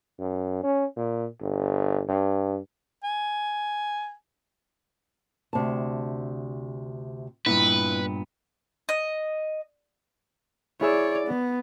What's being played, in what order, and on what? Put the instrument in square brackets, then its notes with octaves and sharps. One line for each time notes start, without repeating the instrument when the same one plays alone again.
[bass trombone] F#2
C#4
A#2
G1
G2
[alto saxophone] G#5
[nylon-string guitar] D2 C3 A5
[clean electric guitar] G2 A#2 B3 [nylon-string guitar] E4 [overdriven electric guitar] B4
[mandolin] D#5
[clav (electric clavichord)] E4 G#4 E5 [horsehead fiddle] C#5 D5
[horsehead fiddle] B3